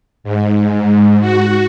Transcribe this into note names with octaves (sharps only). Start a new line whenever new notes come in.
G#2
F#4